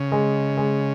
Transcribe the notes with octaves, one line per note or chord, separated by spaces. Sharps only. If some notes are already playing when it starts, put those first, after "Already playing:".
Already playing: C#3
G#3
G#3